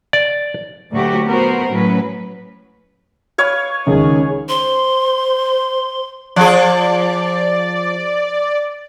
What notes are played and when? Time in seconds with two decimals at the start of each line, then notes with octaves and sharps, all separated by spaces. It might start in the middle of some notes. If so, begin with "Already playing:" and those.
0.13 D5
0.92 D2 A#2 F#3 A3 F#4 G4
1.26 B3 F#4 A#4 C5
1.69 A2 F#3 C#4 B4
3.38 B4 C#5 F5
3.87 C#2 D#3 C#4 G#4
4.49 C5 C6
6.36 F3 G#4 D5